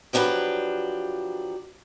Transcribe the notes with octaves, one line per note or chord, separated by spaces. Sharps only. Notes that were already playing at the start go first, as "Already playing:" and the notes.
F3 F#3 D4 G4 B4